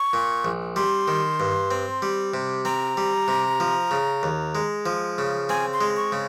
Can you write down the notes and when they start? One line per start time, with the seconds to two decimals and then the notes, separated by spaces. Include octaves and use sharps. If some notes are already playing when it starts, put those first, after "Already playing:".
Already playing: C#6
0.13 A#2
0.45 A#1
0.76 G3 C6
1.08 D#3
1.40 G2
1.71 C4
2.02 G3
2.34 C3
2.65 C4 A#5
2.97 G3
3.28 C3
3.60 F3
3.91 C#3
4.23 D#2
4.55 G#3
4.86 F3
5.18 C#3
5.49 C4 G#5
5.73 C6
5.81 G#3
5.97 C#6
6.12 C#3